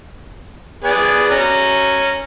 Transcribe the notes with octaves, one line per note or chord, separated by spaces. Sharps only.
B3 G#4 D5
C#4 A#5